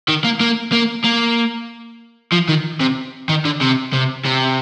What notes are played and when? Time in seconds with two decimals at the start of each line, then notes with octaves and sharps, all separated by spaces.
0.08 D#3
0.24 A#3
0.40 A#3
0.72 A#3
1.05 A#3
2.33 F3
2.49 D#3
2.81 C3
3.29 D#3
3.45 D3
3.61 C3
3.93 C3
4.25 C3